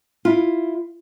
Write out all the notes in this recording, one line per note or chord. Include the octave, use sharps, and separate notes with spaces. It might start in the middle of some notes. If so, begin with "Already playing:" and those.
E4 F4